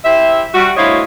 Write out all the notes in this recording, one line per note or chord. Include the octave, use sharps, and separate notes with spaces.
E4 G4 C5 E5
G3 F#4
D2 E4 C5 C#5 D#5 F5